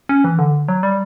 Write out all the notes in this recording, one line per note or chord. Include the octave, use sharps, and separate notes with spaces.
C#4
E3
D3
F#3
G3